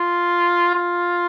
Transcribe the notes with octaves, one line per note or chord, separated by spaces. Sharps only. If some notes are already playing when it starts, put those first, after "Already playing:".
Already playing: F4
F4